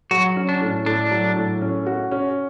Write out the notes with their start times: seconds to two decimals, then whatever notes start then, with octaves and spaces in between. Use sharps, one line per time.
0.11 F#3 F#4
0.36 C#4
0.49 D4
0.61 A2
0.86 A2 D4
1.11 F#3
1.36 A2
1.61 C#4
1.86 F#4
2.11 C#4